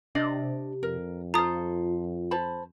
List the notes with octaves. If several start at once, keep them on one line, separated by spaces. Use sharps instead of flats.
C3 D4 D5 D#5
F2 A#4
F4 A4 C5 A#5 D#6
C5 A5 B5